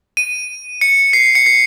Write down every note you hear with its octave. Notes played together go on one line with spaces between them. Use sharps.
D#7
C#7
C7
C#7
C7